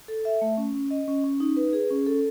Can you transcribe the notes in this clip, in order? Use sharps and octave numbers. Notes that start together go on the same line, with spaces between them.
A4
E5
A3
C#4
C#4
D#5
C#4
C#4
D#4
B4
G#4
C#4
A4